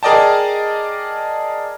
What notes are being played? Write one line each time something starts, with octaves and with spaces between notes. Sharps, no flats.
G#4 A#4 D5 D#5 G5 A5